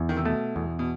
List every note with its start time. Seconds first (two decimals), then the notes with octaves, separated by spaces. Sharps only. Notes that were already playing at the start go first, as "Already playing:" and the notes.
Already playing: E2
0.09 D#3
0.17 C3
0.25 B2 A3
0.56 E2
0.79 B2